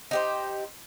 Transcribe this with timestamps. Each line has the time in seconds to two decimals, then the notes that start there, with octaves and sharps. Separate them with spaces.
0.11 D#4 G4 C5